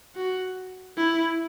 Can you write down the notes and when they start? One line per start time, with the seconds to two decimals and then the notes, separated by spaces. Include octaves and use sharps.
0.15 F#4
0.97 E4